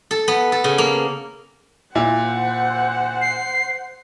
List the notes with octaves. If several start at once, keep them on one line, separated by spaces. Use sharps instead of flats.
A4
B3
A4
C#3
A#3
A#2 E4 C5 F#5
C7